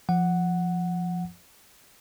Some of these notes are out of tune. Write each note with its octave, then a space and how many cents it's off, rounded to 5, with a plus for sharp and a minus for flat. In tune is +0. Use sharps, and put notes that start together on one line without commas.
F3 +0 F#5 +0